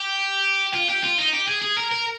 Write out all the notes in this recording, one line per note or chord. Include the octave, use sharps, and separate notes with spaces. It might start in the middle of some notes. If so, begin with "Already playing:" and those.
Already playing: G4
F4
G4
F4
D#4
G4
G#4
G#4
A#4
A#4